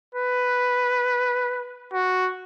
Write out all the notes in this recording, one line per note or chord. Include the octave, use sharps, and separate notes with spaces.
B4
F#4